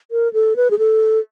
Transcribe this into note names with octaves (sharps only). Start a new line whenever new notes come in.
A#4
A4
B4
G#4
A4